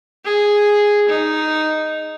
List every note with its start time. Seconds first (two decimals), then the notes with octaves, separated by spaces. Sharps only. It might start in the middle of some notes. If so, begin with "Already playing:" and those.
0.25 G#4
1.09 D#4